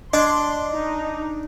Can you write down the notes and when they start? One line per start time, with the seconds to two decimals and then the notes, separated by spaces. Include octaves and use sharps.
0.14 D4 D#5 C6
0.72 D#4